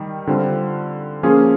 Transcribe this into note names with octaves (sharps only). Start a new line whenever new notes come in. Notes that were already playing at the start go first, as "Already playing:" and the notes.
Already playing: D#3 G3
D3 G3 C4 F4
F3 A#3 C#4 F4 G#4